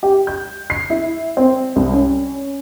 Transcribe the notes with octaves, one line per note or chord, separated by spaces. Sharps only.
G4
G6
C7
E4
C4
C2
C#4